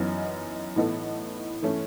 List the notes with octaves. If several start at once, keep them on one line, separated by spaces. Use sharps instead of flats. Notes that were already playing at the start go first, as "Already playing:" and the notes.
Already playing: F#2 E3 B3 D#4
A2 E3 B3 D#4 A4
E3 A3 C#4